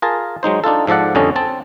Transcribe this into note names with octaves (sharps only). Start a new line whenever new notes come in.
F4 G#4 A#4 A5
F#3 G#3 D#4 C5
D4 D#4 F4 A4
G#2 F3 A4 D5 F#5
F2 D3 G3 C#4 A4 D#5
C4 A5